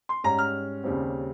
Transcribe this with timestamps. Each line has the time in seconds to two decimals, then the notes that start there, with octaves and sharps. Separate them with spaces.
0.09 C6
0.24 G#2 G3 C#4 A#5
0.39 F6
0.84 D#2 C#3 G3 C4